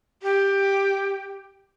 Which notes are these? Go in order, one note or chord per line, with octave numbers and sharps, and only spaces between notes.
G4